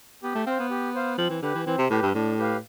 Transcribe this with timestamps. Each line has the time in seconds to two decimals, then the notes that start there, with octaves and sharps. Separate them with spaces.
0.23 B3 G4
0.35 A3
0.46 C4 C5 F5
0.59 B3
0.70 G4
0.95 C5 F5
1.18 F3 C4
1.30 E3
1.42 D3 G4 B4
1.55 E3
1.66 E3 C4
1.78 C3
1.90 A2 G4 B4
2.02 G2
2.14 A2 D4
2.38 G4 B4 F5